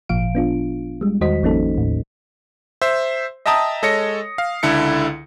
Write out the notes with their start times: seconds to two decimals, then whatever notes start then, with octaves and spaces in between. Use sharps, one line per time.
0.09 G#1 A#2 F3 F5 D7
0.35 B3 D4 F4
1.01 G3 G#3
1.21 E2 D#3 F#4 C5 D#5 B6
1.43 G#1 F3 A#3 C#4 D#4 A4
1.77 D#2 A2
2.82 C5 E5
3.46 D#5 E5 G5 A5 A#5 D#6
3.82 G#3 A4 C#5 D#5 A#6 C#7
4.38 F5
4.63 C#2 D3 E4 A4 C#7